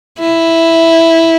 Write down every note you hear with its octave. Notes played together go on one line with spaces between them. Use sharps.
E4